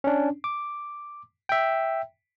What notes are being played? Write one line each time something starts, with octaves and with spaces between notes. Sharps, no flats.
C#4 D4
D6
E5 G5